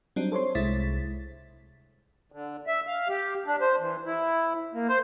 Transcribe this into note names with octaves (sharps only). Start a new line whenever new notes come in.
F#3 G3 C4 D4 D#4
A4 C5 C#5 C6
C2 G#3 E4 A6 B6
D3
E5
F5
G4
D4
C5
E3
E4
A#3
C5